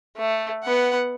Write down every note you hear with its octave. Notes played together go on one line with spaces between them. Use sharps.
A3
B3 F#5